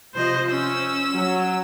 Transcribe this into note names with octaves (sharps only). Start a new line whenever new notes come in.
C3 F3 C5 D#5
C#4 E6
F#3